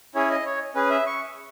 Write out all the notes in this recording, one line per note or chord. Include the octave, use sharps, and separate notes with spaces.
C#4 E4 G#4 C#5
D#5
C#5
C#4 G#4 B4
E5
C#6